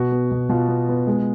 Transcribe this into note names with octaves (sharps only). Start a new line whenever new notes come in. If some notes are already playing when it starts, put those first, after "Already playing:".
Already playing: B2 B3 F#4
B3
B2
B2 F4
B3
B3
G#3